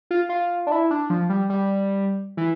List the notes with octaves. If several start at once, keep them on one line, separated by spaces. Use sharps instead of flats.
F4
F4
D4
E4
D4
F3
G3
G3
E3